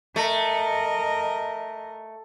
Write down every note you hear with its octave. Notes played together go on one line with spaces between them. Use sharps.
A3 A#4 D#5